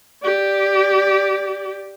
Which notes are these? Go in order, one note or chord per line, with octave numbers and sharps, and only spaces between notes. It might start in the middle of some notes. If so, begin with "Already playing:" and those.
G4 D5